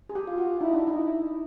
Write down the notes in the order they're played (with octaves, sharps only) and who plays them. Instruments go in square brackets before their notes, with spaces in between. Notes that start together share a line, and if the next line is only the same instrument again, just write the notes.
[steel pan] G#4
G4
[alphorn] F4
[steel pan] F#4
[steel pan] D#4 [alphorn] E4
[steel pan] D4
D#4
[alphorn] E4